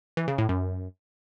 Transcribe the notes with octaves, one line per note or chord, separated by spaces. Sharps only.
E3
C#3
A2
F#2